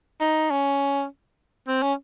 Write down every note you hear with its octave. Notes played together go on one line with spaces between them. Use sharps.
D#4
C#4
C4
C#4